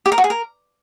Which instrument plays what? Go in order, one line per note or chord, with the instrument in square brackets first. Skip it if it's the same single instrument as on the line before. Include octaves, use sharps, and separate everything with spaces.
[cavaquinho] G4
A#4
F#4
G#4
A#4